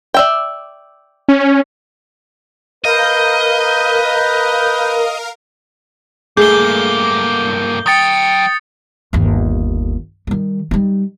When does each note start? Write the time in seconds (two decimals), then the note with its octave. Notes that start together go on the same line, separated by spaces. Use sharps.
0.14 D5 E5 G5
1.29 C#4
2.84 A#4 B4 D#5 F5 G6
6.37 G2 A3 A#3 G#4 G6 G7
7.86 F#3 G5 D#6 A6 C#7
9.13 G1 D#2
10.27 D#3 G3
10.71 G3 D#4